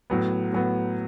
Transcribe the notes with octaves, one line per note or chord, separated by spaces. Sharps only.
A2 F#3 B3
A2 F#3 B3